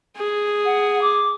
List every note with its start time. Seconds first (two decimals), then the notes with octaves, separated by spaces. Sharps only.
0.18 G#4
0.65 F#5
1.01 D6